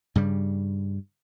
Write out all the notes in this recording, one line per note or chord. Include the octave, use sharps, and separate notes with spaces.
G2 C#3 G3